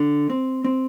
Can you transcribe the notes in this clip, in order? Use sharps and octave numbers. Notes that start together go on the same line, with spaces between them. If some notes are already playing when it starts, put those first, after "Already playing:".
Already playing: D3
C4
C4